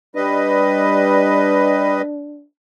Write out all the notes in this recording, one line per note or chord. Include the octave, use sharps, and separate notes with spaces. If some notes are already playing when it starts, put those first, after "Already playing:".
G3 D4 B4 D#5